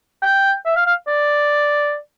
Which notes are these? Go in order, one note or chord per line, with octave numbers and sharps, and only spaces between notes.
G5
E5
F5
F5
D5